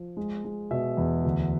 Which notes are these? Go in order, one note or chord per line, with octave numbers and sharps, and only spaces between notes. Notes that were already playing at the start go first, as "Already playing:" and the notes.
Already playing: F3
G#3
G#3
B2 E5
E2
D2